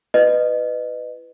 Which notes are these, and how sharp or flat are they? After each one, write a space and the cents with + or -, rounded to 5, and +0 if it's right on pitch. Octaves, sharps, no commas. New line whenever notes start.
E4 +35 B4 +15 D#5 -25